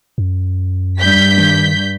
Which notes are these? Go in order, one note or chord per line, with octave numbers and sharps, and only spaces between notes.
F#2
G2 G6 B6
D#3